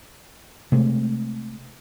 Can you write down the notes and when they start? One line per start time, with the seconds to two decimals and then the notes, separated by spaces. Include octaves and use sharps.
0.72 C3 G#3 A3 C4